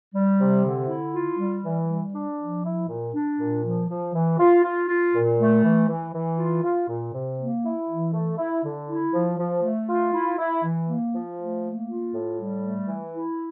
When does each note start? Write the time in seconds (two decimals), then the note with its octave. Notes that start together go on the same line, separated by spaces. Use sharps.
0.15 G3
0.40 C3
0.65 D3
0.89 E4
1.14 F4
1.39 G3
1.64 E3
1.89 G3
2.14 D4
2.40 F3
2.64 E4
2.88 A#2
3.14 D4
3.39 A#2
3.64 F3
3.89 F3
4.15 E3
4.39 F4
4.64 F4
4.88 F4
5.14 A#2
5.38 A3
5.64 E3
5.88 E3
6.14 E3
6.38 F4
6.63 F4
6.89 A#2
7.14 C3
7.39 A#3
7.64 E4
7.89 E3
8.13 A3
8.38 E4
8.64 D3
8.89 E4
9.13 F3
9.38 F3
9.63 A3
9.88 F4
10.13 E4
10.38 E4
10.63 E3
10.88 A#3
11.14 F3
11.39 A3
11.64 A#3
11.88 F4
12.14 A2
12.39 G3
12.64 A3
12.88 E3
13.13 E4